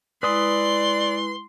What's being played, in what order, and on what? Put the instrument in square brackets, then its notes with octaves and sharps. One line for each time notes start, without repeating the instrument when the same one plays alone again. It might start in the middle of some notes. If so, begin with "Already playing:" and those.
[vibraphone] G#3 E4 [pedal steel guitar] B4 D#6 [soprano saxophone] D5 [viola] C6